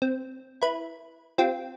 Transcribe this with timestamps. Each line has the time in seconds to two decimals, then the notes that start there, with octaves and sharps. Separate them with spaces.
0.02 C4
0.62 E4 B4
1.38 C4 F4 G4